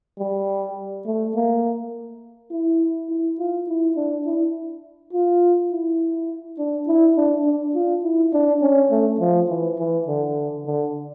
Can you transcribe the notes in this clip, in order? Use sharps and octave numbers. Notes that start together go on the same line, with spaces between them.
G3
A3
A#3
E4
E4
F4
E4
D4
E4
F4
E4
D4
E4
D4
D4
F4
E4
D4
C#4
A3
F3
E3
E3
D3
D3